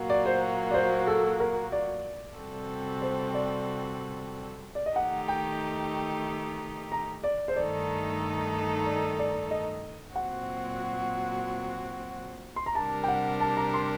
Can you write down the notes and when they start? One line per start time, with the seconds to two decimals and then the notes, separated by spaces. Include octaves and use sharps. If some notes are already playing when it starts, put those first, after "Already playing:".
Already playing: A#2 F#3 A#3 F#4
0.10 D5
0.26 C5
0.71 D5
0.74 C5
1.07 A4
1.40 A#4
1.72 D5
2.37 C3 G3 C4 F#4 A4
3.02 C5
3.34 D5
4.75 D5
4.86 D#5
4.96 D#3 A3 D#4 G4 F#5
5.28 G5
6.92 A#5
7.24 D5
7.48 C5
7.56 G2 D#3 A3 D#4 A4 D5
8.86 D5
9.19 D5
9.51 D#5
10.16 A#2 F#3 C4 F#4 F#5
12.56 C6
12.66 A#5
12.75 C3 G3 D4 G4 A#4 A5
13.04 G5
13.08 F#5
13.40 A5
13.57 A#5
13.74 C6